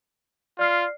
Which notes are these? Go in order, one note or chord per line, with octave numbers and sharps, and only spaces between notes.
F4 D5 F6 C7